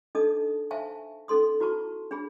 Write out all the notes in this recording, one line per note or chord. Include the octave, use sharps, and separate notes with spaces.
D4 D#4 A4 D#5 A5 D#6
C5 E5 F5 G#5 A5 C#6
C#4 D#4 A4 C6 D#6
E4 F#4 B4 A5 B5 C#6
D4 G#4 B5